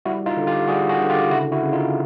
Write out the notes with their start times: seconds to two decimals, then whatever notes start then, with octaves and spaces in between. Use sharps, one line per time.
0.05 G3 E4 F#4
0.26 D#4 F4
0.37 D3
0.47 F4 G4
0.68 G3 F#4 G#4
0.89 F#4 G#4
1.00 D3
1.10 F4 G4
1.31 C#3 E4 F#4
1.52 E4 F#4
1.62 C#3
1.73 D#4 F4